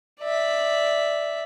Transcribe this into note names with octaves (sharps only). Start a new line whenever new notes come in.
D5 E5